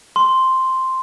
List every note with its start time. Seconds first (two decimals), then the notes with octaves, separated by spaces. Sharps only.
0.16 C6